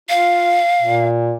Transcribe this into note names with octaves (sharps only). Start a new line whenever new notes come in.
F4 F5
A#2